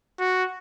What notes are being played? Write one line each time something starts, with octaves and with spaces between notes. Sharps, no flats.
F#4